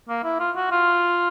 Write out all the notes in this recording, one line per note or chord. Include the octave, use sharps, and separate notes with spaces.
A#3
E4
F4
F#4
F4